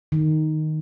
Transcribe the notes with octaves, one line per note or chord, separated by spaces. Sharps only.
D#3